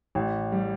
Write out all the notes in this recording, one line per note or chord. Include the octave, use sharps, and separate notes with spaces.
A1
G3